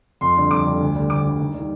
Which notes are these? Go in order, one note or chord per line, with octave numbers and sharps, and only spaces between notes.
F2 C6
D3 G3
F2 D6
D3 G3
D2
D3 G3
D2 D6
D3
G3
D#2
D#3 G3